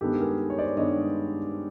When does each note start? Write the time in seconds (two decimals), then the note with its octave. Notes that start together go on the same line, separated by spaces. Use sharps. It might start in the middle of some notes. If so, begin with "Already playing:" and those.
0.01 G2 D#3 G#3 B3 G4 A4
0.20 G#4 A#4
0.50 C#5
0.58 C5 D5
0.77 G2 D#3 G#3 B3 C#5 D#5